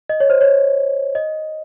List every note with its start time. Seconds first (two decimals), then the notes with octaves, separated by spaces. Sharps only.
0.09 D#5
0.20 C#5
0.30 C5
0.41 C#5
1.15 D#5